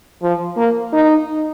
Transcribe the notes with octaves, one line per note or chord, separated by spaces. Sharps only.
F3
A#3
D#4